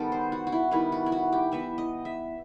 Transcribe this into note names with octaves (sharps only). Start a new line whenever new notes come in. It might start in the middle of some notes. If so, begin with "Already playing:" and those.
Already playing: D#3 G3 B3 A4
C5
F#4
F#4
E4
D#3 G3 B3 E4
F#4
E4
F#4
G4
E3 B3 E5
D#5
E5